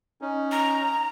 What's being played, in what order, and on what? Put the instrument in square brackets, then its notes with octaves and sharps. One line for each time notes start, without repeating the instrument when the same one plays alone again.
[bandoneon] C#4 D#4
[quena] A#5